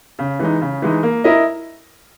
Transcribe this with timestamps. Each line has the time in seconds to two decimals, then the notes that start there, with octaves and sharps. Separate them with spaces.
0.19 C#3
0.39 E3 G#3 D#4
0.61 C#3
0.82 E3 G#3 D#4
1.03 A#3
1.24 E4 A#4 D#5